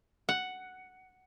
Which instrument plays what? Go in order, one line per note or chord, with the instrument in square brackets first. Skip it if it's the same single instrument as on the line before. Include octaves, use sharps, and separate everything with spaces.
[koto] F#5